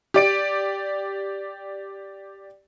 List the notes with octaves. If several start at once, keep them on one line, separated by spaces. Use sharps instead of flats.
G4 D5 D7